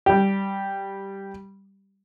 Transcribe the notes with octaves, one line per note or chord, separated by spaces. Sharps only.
G3 G4